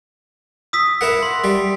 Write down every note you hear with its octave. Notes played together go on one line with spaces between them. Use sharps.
D#6 E6 B6
E4 A#4 F#5
C6
G3